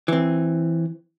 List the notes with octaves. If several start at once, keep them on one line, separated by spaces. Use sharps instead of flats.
E3 C4